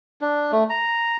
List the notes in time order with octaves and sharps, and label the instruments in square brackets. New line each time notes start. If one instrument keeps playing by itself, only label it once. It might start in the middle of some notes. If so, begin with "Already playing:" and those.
[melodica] D4
A3
A#5